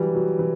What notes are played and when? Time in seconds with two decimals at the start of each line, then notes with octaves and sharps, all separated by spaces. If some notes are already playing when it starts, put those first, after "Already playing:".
Already playing: E3 F#3 G3
0.15 F#3
0.39 E3